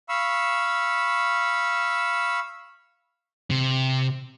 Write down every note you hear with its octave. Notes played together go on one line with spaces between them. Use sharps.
F5 B5 C#6 E6
C3